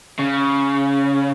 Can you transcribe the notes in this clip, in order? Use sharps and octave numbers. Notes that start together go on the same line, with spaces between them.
C#3